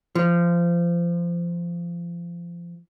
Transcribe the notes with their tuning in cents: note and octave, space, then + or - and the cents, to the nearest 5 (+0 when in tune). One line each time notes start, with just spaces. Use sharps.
F3 -25